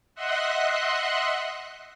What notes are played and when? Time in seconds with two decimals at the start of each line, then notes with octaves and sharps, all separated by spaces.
0.15 D#5 E5 F#5 C6 F#6